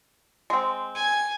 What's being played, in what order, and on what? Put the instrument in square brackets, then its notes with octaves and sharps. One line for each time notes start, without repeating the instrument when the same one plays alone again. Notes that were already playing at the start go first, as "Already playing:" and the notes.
[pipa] G#3 C4
[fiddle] G#5